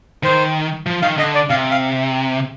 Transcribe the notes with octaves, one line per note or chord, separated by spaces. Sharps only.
D#3 C5
F3
D#3 F5
D3 D#5
D5
C3 F5
F5